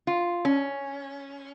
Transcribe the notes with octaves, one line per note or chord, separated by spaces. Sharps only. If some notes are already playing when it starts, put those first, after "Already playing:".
F4
C#4